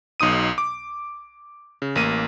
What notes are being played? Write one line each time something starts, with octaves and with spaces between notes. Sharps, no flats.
B1 D#4 D#6 D#7
D6
C#3
A1 A#3 D#7